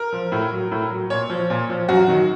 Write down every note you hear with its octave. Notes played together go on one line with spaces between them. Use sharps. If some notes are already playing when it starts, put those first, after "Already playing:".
Already playing: A#4
F3
A2
F#3
A2
F#3
A#2 C#5
F3
A#2
F3
F#2 F#4
D#3 F#3